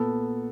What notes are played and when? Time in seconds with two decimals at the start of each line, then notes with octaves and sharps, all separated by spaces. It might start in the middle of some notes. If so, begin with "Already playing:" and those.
Already playing: A#2 B3 A4